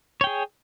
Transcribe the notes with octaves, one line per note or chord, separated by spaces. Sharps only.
G#4 C#5 G5